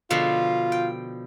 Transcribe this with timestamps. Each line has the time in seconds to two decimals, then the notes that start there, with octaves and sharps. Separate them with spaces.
0.11 B2 D3 F3 F4
0.72 G5